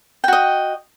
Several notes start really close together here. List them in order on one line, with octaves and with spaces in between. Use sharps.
G5 F#4 D#5